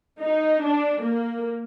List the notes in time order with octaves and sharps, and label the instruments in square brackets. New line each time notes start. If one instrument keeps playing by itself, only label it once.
[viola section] D#4
D4
A#3